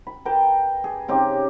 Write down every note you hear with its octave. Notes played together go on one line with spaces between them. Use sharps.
B5
A#4 B4 G5 A5
G#4
C#3 C4 D#4 G4